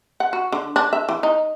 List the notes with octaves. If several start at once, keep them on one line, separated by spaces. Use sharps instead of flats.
F#5
F#4
D3
D4
E5
E3
D#4